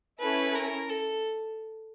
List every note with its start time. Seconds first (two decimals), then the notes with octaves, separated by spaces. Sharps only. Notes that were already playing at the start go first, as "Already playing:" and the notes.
0.20 C#4 E4 A4 B4
0.55 A#4
0.90 A4